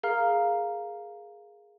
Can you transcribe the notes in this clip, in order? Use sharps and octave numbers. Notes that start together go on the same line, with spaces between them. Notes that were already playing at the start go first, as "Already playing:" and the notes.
G#4 A#4 F5 A#5 F6